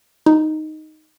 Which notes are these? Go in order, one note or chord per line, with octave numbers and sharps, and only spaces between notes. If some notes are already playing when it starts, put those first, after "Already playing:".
D#4